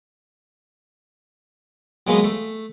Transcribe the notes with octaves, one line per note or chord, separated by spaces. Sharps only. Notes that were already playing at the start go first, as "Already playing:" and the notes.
F#3 G#3 A#3 B3
A3